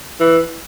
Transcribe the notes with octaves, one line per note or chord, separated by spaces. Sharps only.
E3